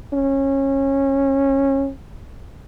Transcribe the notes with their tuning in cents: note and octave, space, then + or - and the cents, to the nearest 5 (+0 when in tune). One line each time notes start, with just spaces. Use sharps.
C#4 -20